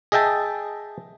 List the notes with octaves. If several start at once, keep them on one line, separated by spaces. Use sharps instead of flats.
G#4 D#5 E5 G5 A5